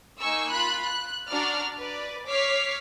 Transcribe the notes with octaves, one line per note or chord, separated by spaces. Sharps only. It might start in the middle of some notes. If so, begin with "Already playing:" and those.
A#3 D#4 G#5 C#6 E6
F4 B5 F#6
F#6
D4 F#4 D5 A#5 F6
B4 D5
C#5 D6 F6 B6 C7